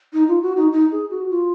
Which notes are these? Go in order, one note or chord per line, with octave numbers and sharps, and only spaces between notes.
D#4
F4
F#4
D#4
D#4
G#4
F#4
F4